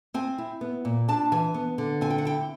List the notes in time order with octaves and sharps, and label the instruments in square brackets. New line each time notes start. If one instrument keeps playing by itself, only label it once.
[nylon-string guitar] C4 G#5
E4
B3
A#2
D4 A5
E3 G#5
B3
D3
C4 G#5
G5
F#5
E4 G5